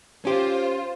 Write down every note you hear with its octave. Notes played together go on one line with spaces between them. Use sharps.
C#4 F4 G4 C5